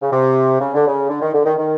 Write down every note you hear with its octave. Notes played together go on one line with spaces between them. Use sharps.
C#3
C3
C#3
D3
C#3
D3
D#3
D3
D#3
D#3